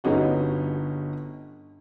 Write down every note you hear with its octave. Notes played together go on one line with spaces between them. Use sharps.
G1 C#4 D#4 F#4